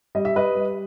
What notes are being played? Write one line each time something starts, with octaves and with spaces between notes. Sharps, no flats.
G3 D#5
E5
G3 B4 D#5
G3